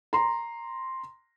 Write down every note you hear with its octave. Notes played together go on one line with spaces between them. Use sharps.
A#5 C6